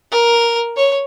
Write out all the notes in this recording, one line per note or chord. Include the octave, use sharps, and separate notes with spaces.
A#4
C#5